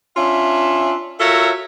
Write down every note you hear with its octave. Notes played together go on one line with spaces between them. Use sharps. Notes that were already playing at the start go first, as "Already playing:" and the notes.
C#4 D4 F4 E5
F4 F#4 A4 A#4 C#5 E5